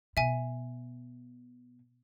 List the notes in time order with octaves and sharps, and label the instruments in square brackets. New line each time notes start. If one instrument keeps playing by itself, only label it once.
[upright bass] B2 [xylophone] E5 G#5